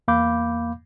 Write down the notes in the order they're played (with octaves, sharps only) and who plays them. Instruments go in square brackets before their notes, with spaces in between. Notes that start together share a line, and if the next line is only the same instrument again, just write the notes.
[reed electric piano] E2 A#3 F5 B5 D6 G6